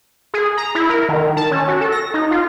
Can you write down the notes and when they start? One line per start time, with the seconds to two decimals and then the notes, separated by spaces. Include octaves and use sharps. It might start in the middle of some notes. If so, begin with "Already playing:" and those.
0.34 G#4
0.57 A#5
0.75 E4
0.90 A#4
1.09 D#3
1.37 A5
1.51 C#4
1.68 F#4
1.81 A4
1.92 A#6
2.14 D#4
2.31 F4